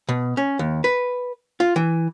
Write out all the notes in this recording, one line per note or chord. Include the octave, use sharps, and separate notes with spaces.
B2
C#4
D#2
B4
F4
E3